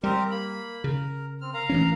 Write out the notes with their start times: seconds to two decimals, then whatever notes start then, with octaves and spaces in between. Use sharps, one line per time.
0.03 G3 C4 G4 A#4
0.31 A#3 B5
0.84 C#3 A#4
1.41 C4 F6
1.54 A#4 F5 A#5
1.69 A1 E3 C#4